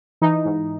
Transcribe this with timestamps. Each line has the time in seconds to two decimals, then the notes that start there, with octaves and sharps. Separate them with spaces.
0.22 E3 D#4
0.45 G#2